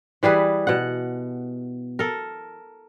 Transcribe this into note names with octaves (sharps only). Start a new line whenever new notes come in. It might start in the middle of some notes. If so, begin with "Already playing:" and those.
E3 G3 G#4 B4
B2 F#5
A4 A#4